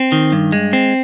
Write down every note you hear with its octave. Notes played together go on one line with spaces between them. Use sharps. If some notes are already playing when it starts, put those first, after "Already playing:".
Already playing: C4
D#3
G2
G#3
C4